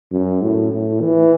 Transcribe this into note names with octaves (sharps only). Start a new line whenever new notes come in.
F#2
A2
A2
E3